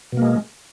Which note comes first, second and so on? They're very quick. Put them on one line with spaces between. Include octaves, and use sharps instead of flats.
B2 A#3 G#3